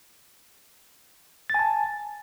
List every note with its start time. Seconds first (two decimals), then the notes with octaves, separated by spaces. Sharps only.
1.50 A6
1.54 G#5
1.59 A5